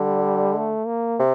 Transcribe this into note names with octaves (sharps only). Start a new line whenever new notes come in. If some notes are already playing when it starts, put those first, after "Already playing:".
Already playing: D3 G3
A3
A#3
C3